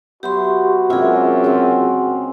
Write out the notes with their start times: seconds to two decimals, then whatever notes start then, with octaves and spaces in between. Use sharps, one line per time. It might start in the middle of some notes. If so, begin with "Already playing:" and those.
0.23 F#3 B3 F#4 G4 E5 C6
0.90 F#2 C3 G#3 A#3 F4 G#4
1.44 C#3 C4